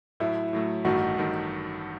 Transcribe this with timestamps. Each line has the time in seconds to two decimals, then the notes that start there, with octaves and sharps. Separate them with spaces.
0.20 A2 F#3 A3 E4
0.53 A2 F#3 A3
0.84 A1 G2 D#3 A3 D#4 F#4
1.17 A1 G2 D#3 A3 D#4